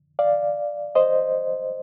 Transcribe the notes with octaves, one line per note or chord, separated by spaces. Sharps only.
D5 F5
C5 D#5